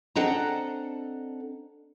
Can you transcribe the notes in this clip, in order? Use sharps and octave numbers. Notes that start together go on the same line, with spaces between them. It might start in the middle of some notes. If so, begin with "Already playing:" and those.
C4 D4 A4 D#5 F#5 A#5